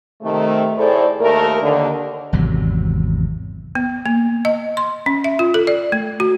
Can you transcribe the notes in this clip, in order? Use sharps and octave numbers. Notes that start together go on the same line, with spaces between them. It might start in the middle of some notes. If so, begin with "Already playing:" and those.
C3 D#3 A3
A2 G#4 A4 C5 D5
D#2 A3 A#4
D#2 D3
G#1 E2 C3 F#3
B3
A#3
D#5
C6
C#4
E5
F4
A4
D5
A3
F#4